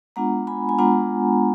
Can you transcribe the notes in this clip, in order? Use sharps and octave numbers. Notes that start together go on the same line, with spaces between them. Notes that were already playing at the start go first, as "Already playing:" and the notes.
G#3 B3 D4 F4 F#5 A#5
G#5 B5
G#5
G#3 B3 D4 F4 F#5 A#5